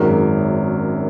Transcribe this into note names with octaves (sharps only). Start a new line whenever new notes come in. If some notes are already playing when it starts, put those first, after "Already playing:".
Already playing: G#1 F#2 D#3 G#3 A#4